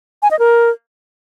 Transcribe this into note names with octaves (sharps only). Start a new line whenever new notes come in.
G#5
D#5
A#4